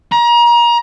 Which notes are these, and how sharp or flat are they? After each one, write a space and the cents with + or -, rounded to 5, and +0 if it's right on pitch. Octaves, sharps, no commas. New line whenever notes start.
A#5 +30